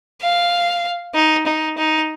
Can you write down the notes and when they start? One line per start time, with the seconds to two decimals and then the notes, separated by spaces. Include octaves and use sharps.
0.22 F5
1.15 D#4
1.46 D#4
1.78 D#4